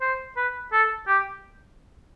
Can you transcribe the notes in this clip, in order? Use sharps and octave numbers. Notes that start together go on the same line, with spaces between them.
C5
B4
A4
G4